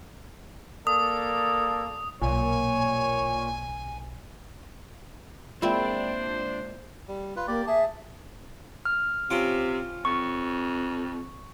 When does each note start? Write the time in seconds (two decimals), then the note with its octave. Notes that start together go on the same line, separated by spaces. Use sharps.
0.87 A#3 A4 D5 D#6
2.22 B1 A#2 C#5 G#5
5.62 G#3 A#3 C4 D4 E4 F4 C5 D5
7.08 G3
7.36 F4 B4
7.48 A#3 G4 D5
7.67 G#4 E5 A5
8.85 F6
9.30 C3 C#4 F4 G5
10.05 F2 C#6